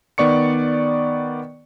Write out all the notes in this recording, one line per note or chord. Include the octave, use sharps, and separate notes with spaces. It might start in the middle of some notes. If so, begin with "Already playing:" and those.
D#3 B3 D5 C#6 C#7